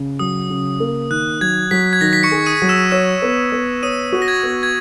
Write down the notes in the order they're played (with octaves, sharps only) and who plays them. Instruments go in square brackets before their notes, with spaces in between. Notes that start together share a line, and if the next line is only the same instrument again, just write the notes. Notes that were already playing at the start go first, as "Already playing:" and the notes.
Already playing: [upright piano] C#3
[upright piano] F#3 [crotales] D#6
[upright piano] C#3
A#3
[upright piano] D#3 [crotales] F#6
[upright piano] F#3 [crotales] G#6
[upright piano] F#3 [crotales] B6
[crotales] G#6
[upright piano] D#3 [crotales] A#6
[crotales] B6
C#6 C#7
[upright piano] G#4
[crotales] D#6 D#7
[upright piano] F#3
[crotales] E6 E7
[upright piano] C#5 [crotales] E6 E7
[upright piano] B3
B3
[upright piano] C#5 [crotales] D#6 D#7
[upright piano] F#4
[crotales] A#6
G#6
[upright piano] B3
[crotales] G#6